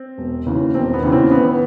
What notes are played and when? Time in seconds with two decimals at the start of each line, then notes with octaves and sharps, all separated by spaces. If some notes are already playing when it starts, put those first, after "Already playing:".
Already playing: C4
0.18 E1
0.46 D#2 C#3 E3
0.74 E1 C4
0.94 B3
1.03 D#2 C#3 E3
1.12 C4
1.31 A1 B3